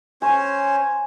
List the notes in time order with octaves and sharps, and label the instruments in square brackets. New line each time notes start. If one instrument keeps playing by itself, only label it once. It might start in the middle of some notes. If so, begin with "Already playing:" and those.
[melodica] C#4 C5 C#5 [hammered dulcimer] G#5